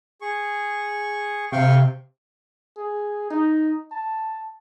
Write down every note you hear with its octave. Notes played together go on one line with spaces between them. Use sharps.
G#4 C#6
C3 F5 G5 C#6
G#4
D#4
A5